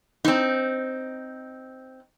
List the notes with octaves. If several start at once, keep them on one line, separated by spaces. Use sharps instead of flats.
C4 D#4